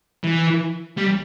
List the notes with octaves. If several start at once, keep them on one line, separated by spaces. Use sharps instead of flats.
E3
G3